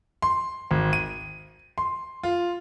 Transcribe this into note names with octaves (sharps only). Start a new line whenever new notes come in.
C6
G#1
D#7
C6
F4